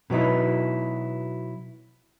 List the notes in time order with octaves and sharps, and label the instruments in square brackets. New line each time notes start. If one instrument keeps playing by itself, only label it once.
[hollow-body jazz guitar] B2 F#3 B3 D#4 E4